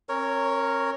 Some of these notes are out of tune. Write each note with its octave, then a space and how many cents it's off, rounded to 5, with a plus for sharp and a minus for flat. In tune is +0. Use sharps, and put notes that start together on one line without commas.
C4 +45 A#4 -10 C#5 +0